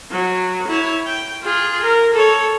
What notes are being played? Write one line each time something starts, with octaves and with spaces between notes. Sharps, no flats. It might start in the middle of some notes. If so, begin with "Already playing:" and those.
F#3
E4 C#5
G5
F4 G#4
A#4
A4 C#5